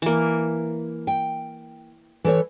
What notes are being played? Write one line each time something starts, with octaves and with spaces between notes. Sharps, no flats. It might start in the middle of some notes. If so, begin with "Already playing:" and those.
E3 A#3
G5
E3 A4 C#5